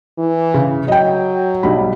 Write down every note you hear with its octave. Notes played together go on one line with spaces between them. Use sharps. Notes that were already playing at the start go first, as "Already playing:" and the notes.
E3
C#3
F#3 D#5 G5
B1 G3 B5